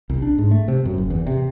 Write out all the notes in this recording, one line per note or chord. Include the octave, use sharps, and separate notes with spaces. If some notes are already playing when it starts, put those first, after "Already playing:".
C2
D4
G#2
A3
C3
F#2
F#1
E2
C3